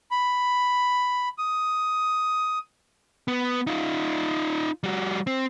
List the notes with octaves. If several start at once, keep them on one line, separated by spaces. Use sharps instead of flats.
B5
D#6
B3
D#4 F4
G3 F#4
C4